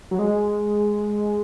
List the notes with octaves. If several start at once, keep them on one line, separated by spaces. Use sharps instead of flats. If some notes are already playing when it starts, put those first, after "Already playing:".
F#3
G#3